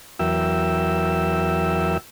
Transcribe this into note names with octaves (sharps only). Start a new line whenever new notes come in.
E2 F#3 A#4 E5 G5 E6